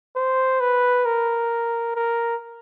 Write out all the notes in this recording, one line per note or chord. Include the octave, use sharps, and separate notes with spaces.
C5
B4
A#4
A#4